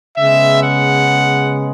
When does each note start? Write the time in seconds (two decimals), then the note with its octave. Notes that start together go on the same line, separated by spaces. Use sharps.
0.17 C#3 G#3 B3 E5
0.63 F#5